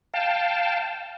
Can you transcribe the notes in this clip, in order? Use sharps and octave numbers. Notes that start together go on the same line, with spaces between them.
F5 G5 A5